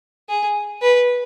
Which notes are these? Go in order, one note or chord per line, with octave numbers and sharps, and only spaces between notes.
G#4
B4